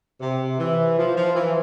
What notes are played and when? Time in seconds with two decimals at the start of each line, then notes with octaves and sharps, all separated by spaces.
0.20 C3
0.58 E3
0.97 F3
1.16 F3
1.35 E3